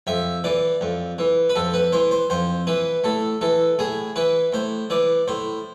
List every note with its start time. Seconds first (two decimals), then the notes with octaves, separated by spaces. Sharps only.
0.07 F2 E5
0.44 E3 D5
0.81 F2
1.19 E3
1.49 B4
1.56 F2 A4
1.74 B4
1.92 E3 C5
2.11 C5
2.30 F2 C5
2.67 E3 B4
3.04 A2 A4
3.41 E3 A4
3.79 A2 G#4
4.16 E3 B4
4.53 A2 C5
4.90 E3 D5
5.28 A2 C5